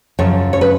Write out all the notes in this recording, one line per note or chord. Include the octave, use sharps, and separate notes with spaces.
F#2 C#3 F3 C#5
C#5
B4